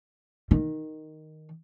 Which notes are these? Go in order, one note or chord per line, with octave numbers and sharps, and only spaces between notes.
D#3